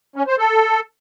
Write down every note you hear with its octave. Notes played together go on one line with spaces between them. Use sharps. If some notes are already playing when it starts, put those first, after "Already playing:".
C#4
C5
A4